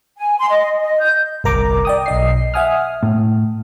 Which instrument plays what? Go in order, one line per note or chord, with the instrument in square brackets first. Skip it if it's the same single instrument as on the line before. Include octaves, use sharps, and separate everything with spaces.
[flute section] G#5
C6
D#5
D#5
G6
[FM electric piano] G1 C2 A#4 A#5 D6
D5 G5 D#6
B1 D#5 C7
E5 F#5 G#5 D#6 F6
[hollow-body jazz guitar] A2